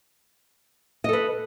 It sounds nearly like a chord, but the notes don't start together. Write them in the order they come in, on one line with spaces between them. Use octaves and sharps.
D#5 A4 B4